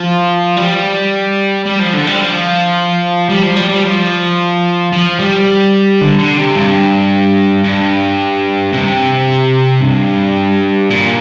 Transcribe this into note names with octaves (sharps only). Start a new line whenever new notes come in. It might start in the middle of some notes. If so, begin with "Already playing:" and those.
Already playing: F3
G3
G3
F3
D3
G3
F3
G3
F3
G3
G3
F3
F3
G3
D3
D3
C3
G2
G2
C3
G2
A#2